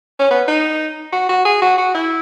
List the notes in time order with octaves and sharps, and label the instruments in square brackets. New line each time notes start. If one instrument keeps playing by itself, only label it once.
[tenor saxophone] C#4
B3
D#4
F#4
F#4
G#4
F#4
F#4
E4